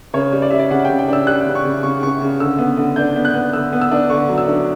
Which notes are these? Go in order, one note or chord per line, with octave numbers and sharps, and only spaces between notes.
C#3 C#5
G3
D5
G3 E5
D5
C#3 F#5
C#3 G5
G5
D4 E6
G3 F#6
C#3
C#6
C#3
C#3 C#6
C#3 C#6
C#3
D3 E6
B3
D3
D4 G6
B3
F#6
B3
D3 E6
B3
E6
D4
D3 C#6
F#3
E6
D4